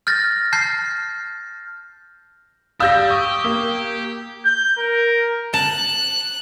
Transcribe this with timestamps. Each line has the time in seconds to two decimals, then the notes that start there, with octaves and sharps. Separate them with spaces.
0.07 F6 G6 A6 A#6
0.53 A5 F6 G6 C7
2.80 G3 G4 F5 E6 G6 A#6
3.10 G4 C#6 D#6
3.44 A#3
4.45 G6
4.78 A#4
5.54 A5 F#6